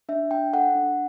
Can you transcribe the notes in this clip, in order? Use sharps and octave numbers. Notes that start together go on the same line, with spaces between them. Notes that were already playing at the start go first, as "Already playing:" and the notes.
D4 E5
D4 G5
A4 F#5
D4